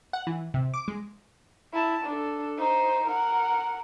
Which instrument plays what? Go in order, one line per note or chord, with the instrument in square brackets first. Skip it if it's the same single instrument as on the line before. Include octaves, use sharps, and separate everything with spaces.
[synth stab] F#5
E3
C3
D6
G#3
[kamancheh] E4 A5
D4 A4
D#4 C5
A#4 F#5